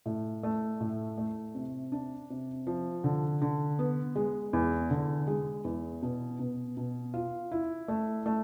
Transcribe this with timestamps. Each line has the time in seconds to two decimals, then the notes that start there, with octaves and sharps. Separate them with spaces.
0.06 A2
0.43 A3
0.80 A2
1.18 A3
1.55 C3
1.92 D4
2.30 C3
2.67 F3
3.04 D3
3.42 D3
3.79 B3
4.15 G#3
4.53 E2
4.90 D3
5.27 G#3
5.65 E2
6.02 B2
6.39 B2
6.77 B2
7.14 F4
7.52 E4
7.88 A3
8.26 A3